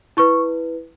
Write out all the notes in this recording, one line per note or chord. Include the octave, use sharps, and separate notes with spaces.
E4 B4 C#6